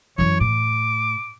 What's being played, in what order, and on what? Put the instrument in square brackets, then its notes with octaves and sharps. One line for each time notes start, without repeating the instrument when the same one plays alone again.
[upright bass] F#2 E3 [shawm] C#5
[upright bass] A2 [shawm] D6